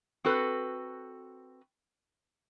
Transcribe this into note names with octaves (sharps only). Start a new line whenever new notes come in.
C4 F#4 A4 B4